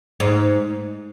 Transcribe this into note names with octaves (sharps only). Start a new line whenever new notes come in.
G#2